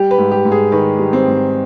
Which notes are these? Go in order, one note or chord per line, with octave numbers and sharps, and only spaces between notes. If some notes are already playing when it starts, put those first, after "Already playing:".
Already playing: G3 G4
B4
G#2
G4
G#2
G#4
D#3 B4
G3
C4
G#2